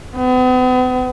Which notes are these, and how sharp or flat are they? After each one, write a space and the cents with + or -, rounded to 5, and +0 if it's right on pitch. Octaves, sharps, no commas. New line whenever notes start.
B3 +40